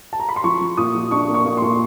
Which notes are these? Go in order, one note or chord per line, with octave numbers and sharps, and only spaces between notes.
A5
A#5
B5
C6
F3 C#6
F3
A#2 D#6
F3
D4 C#6
A#3
C#6
A#3
C6
A#2